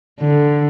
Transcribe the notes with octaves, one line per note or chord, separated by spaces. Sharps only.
D3